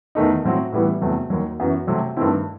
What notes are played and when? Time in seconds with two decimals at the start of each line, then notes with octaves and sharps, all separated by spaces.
0.15 E2 D#3 A3 D#4
0.44 A2 F#3 C4 F#4
0.72 A2 E3 G3 B3 E4
1.01 E2 C3 F#3 A3
1.30 D#2 D#3 F#3
1.60 F#2 E3 B3 F#4
1.87 C3 F#3 A3 C4
2.17 G2 D#3 A3 C4 E4